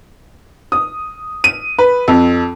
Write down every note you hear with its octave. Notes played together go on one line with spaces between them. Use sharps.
D#6
D#7
B4
F2